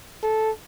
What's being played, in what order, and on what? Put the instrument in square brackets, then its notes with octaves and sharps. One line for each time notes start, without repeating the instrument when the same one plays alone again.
[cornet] A4